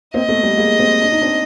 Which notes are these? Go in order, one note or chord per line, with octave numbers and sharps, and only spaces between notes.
A#3 C4 D#5
A3 B3
G3 A3
G#3 A#3
A#3 C4
D4
D#4
C4 D4